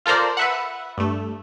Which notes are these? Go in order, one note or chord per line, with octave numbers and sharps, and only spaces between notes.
F4 A4 A#4 C5 D5
B4 E5 F#5
G2 A3